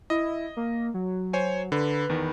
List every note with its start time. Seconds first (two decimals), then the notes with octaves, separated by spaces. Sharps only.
0.10 E4 D#5
0.57 A#3
0.94 F#3
1.33 C5 C#5 G#5
1.72 D3 B4
2.09 E2 D#3